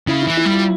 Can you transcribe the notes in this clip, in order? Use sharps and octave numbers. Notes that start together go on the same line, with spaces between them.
C#3 E4
E4
E3
E4
G3
F4